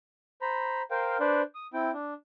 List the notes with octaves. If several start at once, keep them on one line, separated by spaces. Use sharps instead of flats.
C5 A#5 B5
A#4 C5 F5 G5
D4 B4 C5 D5
D#6
C4 E4 G5
D4